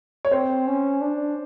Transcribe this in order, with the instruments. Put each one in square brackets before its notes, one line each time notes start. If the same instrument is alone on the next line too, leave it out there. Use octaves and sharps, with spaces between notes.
[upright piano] C#5
[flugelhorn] C4 [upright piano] C5
[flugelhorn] C#4
D4